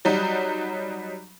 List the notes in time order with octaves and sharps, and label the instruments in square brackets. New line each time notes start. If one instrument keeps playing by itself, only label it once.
[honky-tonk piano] F#3 G3 D#4